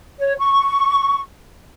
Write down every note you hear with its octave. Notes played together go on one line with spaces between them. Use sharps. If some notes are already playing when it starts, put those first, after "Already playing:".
C#5
C#6